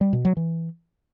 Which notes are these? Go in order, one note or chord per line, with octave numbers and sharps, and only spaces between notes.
G3
B2
F#3
E3